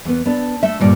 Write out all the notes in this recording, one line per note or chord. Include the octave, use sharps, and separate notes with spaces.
E2 B3
B3 D4
A3 E5
D2 G2 A#2 D5